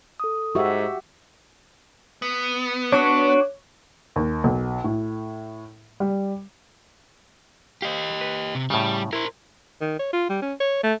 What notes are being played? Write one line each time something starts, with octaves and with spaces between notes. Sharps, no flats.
A4 D#6
G#2 F#4 G4 E5 C#6
B3
D4 F#4 C#5
D#2
B1
A2
G3
G4 C5 D#5 F5
B4
C3
A2 C#3 G3
E4 A#4 C5
D#3
C#5
F4
G3
C#4
C#5
A3